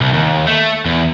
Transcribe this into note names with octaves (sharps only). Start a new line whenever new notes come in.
C2
D#2
A3
E2